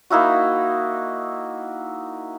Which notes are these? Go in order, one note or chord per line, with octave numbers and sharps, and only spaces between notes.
A#3 D#4 E4 F#4